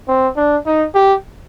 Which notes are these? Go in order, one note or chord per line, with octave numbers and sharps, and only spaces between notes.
C4
D4
D#4
G4